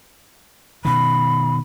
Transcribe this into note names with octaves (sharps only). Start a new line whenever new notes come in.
B2 D#3 B5